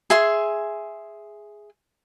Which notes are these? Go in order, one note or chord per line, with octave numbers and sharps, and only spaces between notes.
G#4 E5 C6